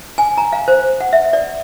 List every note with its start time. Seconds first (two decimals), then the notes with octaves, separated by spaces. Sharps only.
0.18 G#5
0.38 A#5
0.53 F5
0.68 C5
1.00 F#5
1.13 E5
1.33 D5